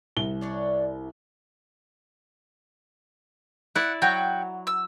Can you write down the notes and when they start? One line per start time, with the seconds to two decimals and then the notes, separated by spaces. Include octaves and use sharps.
0.16 C2 G7
0.41 D4 C#5 D5
3.76 E4 D5 F#5
4.02 F#3 F#4 G5
4.67 E6